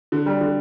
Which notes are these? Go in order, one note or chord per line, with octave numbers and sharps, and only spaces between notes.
D3
G3
D3